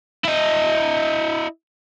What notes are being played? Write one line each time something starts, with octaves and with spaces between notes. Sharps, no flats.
E4 D#5